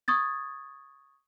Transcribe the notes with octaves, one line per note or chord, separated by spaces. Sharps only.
C#6 D#6 G#6 A6